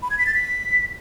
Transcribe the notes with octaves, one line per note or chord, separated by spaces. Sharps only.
B5
G#6
B6
A6
B6